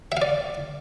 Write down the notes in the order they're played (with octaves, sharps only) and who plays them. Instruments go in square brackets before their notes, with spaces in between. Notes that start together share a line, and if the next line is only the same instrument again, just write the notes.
[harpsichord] E5
F5
D5